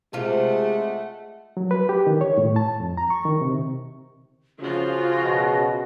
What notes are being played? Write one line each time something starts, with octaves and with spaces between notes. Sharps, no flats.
C3 G#3 A3 F4 F#5
F#3
B4
G4
D#3
C#5
A2
A5
F2
A#5
C#6
D#3
C3
C#3 F3 F4 F#4
B2